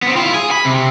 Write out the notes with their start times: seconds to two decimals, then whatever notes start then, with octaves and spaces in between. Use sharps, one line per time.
0.02 B3 C4
0.16 E4 F4
0.34 G#4
0.51 B5
0.65 C3